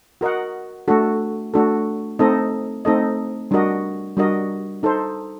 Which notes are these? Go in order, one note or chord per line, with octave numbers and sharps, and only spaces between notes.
F#4 A#4 D#5 F#5
A3 D4 F#4 A4
A3 D4 F#4 A4
A3 C4 D#4 A4 D#5
A3 C4 D#4 A4 D#5
G3 D4 F#4 A#4 D#5
G3 D4 F#4 A#4 D#5
D#4 A4 C5